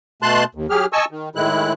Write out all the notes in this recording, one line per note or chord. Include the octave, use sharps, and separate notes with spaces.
B2 A3 A5 C6 F#6
D#2
F#3 G4 G#4 F6
D#5 G#5 A5 C#6 E6
D#3
A2 D#3 G#3 E4 F#6